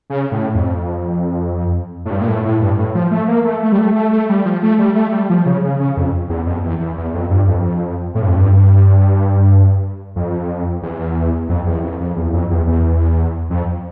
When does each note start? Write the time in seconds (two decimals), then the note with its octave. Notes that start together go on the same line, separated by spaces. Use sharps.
0.10 C#3
0.32 A2
0.54 F2
2.05 A2
2.10 G2
2.21 A#2
2.28 A2
2.45 A2
2.61 G2
2.79 A2
2.95 F3
3.11 A3
3.28 A#3
3.45 A3
3.62 A3
3.72 G3
3.78 A3
3.95 A3
4.12 A3
4.29 G3
4.45 F3
4.63 A3
4.79 G3
4.95 A3
5.12 G3
5.30 F3
5.46 C#3
5.63 C#3
5.80 C#3
5.97 F2
6.29 E2
6.46 F2
6.63 E2
6.80 E2
6.97 E2
7.14 F2
7.30 G2
7.48 F2
8.15 A2
8.22 G2
8.29 F2
8.37 G2
10.16 F2
10.82 E2
11.49 F2
11.66 E2
11.83 F2
12.00 F2
12.16 E2
12.33 F2
12.50 E2
12.67 E2
13.50 F2